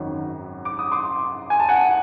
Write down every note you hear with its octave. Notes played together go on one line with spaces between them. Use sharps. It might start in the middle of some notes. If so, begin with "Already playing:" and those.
Already playing: G#1 F#2 D#3 F#3
D6
D#6
C6 D6
G#5
A5
F#5 G#5